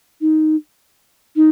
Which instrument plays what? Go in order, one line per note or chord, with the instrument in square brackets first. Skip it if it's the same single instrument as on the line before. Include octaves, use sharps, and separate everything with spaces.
[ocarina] D#4
D#4